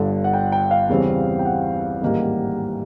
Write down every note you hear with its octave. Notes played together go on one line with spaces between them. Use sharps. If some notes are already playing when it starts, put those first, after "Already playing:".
Already playing: G1 G2 D3
F#5
G5
G5
F5
E2 C#3 E3 G3 C4
G5
F#5
A1 G#2 D#3 G3 A#3